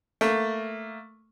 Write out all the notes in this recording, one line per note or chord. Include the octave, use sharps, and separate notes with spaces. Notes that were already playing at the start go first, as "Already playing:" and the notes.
A3 A#3